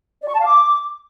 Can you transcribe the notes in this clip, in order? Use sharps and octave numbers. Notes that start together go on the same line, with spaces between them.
D5
C#6
A5
F5
D6